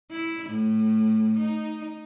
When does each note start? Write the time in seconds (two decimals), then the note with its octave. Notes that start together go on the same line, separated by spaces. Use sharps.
0.11 E4
0.50 A2
1.39 D#4